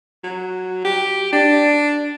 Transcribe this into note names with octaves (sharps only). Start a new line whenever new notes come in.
F#3
G4
D4